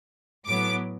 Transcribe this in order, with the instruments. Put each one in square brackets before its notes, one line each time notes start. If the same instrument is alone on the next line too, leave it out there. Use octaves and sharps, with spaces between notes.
[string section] A2 F#3 B3 D6